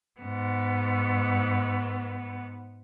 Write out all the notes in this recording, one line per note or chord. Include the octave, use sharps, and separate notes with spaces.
G#2 B3